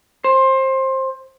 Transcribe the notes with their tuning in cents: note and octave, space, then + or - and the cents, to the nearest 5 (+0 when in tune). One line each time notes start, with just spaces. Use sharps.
C5 +20